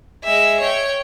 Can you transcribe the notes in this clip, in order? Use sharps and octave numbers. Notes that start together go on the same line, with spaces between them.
G#3 E5
C#5 G5